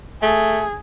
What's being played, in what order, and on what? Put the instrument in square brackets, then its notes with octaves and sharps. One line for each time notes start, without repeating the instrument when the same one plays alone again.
[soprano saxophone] A3 [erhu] G#4